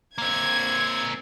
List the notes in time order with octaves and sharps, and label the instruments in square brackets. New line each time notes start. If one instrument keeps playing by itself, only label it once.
[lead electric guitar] A#3 C4 [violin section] G#6